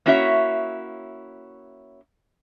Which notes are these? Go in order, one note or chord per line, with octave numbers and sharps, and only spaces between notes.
A#3 C#4 E4 F#4 C#5 E5